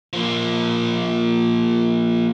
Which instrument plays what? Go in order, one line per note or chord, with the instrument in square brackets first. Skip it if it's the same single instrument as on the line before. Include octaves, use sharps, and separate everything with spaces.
[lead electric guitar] F3 A#3